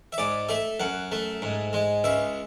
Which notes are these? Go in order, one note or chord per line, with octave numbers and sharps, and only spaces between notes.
E5
G#2 D5
A3 E5
F#2 F#5
A3
G#2
G#3
C#2 E5